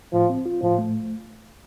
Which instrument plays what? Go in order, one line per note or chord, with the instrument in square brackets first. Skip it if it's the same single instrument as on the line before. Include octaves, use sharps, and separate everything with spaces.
[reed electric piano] A2 [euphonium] F3
[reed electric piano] C4
F4
[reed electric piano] A2 [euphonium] F3
[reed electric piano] A3